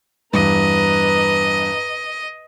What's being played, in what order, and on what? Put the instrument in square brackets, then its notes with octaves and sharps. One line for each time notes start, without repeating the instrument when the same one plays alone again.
[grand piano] E2 G2 [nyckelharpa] B4 A#5 [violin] D#5